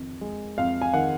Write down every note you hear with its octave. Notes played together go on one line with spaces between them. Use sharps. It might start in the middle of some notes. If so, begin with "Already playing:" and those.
Already playing: F2 D#3
G#3
F2 F5
G#5
D#3 F#5